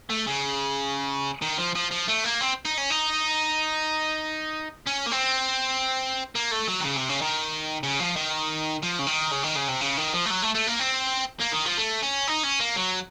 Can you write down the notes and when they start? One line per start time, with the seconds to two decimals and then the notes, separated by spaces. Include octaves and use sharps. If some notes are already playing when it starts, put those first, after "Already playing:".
0.10 A3
0.27 C#3
1.42 D#3
1.58 F3
1.75 F3
1.91 F3
2.08 A3
2.24 A#3
2.41 C4
2.65 D#4
2.77 C#4
2.90 D#4
4.87 C#4
5.07 A#3
5.12 C4
6.35 A#3
6.52 A3
6.68 F#3
6.80 D#3
6.85 C#3
6.97 C3
7.09 C#3
7.22 D#3
7.83 C#3
8.00 F3
8.16 D#3
8.82 F3
8.99 C#3
9.07 D#3
9.32 C#3
9.44 D#3
9.56 C#3
9.68 C3
9.81 C#3
9.97 D#3
10.13 F3
10.25 A3
10.30 F#3
10.42 A3
10.55 A3
10.67 A#3
10.79 C4
11.41 A#3
11.53 D#3
11.66 F3
11.78 A3
12.02 C#4
12.28 D#4
12.44 C#4
12.60 A#3
12.77 F#3